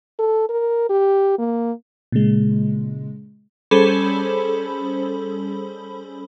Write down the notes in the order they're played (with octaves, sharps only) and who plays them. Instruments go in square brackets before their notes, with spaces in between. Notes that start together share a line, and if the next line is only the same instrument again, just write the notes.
[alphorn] A4
A#4
G4
A#3
[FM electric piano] A#2 C#3 G#3
[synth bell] G3 C#4 G#4 A4 C5 B5